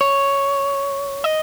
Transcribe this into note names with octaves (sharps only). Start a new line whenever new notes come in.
C#5
D#5